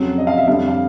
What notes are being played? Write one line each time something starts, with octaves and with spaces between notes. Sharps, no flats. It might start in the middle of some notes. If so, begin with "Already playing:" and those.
Already playing: F2 C#3 F#3
D#5
F5
E5
F2 D3 G3 F5
F5